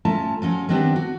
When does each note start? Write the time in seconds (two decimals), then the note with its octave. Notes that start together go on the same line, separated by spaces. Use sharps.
0.05 A3 C#4 F4 A5 A#5
0.42 F3 F#3 C#4
0.69 D#3 F#3 B3 C4 D4 G4
0.96 F#4